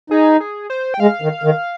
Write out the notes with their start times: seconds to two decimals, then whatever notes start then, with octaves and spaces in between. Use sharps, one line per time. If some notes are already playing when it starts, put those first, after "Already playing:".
0.10 D#4 G#4
0.40 G#4
0.70 C5
0.94 G5
1.00 G#3 F5
1.22 D#3
1.44 D#3